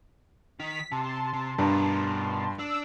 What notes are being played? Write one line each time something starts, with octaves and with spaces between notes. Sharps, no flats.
D#3 D#4 B6
C3 A5 C6
C3
G2 B2 A#4
D4 E6